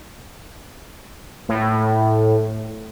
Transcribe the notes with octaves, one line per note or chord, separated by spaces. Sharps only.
A2